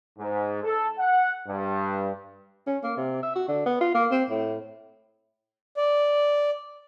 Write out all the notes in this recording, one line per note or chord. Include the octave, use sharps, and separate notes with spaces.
G#2
A4
F#5
G2
C#4
A#3
C3
E5
F#4
D3
B3
F4
A#3
C4
A2
D5